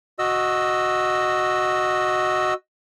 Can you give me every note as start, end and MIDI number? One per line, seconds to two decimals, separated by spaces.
0.19 2.54 66
0.19 2.54 75
0.19 2.54 88